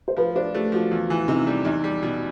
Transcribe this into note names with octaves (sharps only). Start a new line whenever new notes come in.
C5
F3 B4
D4 C5
A3 G4
F3 F#4
E2 F4
E3 E4
C3 D#4
G3
E2 D#4
G3
B2